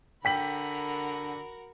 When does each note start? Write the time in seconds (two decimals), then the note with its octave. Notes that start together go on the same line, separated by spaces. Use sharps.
0.25 D3 F#4 A#4 G5 B5 B6 F#7